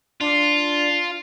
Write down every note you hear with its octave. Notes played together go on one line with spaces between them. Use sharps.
D4 F4